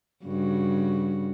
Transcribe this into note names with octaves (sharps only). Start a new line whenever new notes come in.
G2 C#3 F#4